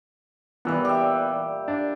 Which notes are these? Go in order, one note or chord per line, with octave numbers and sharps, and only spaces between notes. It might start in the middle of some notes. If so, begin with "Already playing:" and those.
A#2 E3 G3 B3
G4 E5
D4